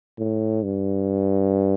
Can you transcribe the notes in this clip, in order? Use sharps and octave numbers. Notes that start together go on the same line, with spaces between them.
A2
G2